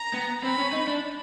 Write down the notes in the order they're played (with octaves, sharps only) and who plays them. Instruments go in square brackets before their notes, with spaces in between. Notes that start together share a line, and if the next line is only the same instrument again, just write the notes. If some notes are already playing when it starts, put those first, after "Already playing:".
Already playing: [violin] A#5
[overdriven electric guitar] B3
[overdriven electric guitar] C4 [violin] B5
[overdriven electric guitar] C#4
D#4
D4